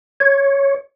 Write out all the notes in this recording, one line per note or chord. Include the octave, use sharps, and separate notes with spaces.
C#5